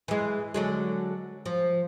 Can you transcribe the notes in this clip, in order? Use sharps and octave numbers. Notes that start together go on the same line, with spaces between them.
E3 G#3
D3 F#3 G#3
F3